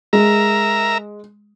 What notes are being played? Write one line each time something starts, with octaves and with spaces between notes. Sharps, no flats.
G#3 A#4 E5 A#5